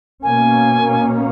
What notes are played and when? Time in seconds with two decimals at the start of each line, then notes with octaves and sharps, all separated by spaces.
0.23 B2 A#3 C#4 G#5